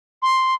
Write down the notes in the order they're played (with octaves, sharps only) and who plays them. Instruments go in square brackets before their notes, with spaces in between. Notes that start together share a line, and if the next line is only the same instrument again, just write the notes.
[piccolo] C6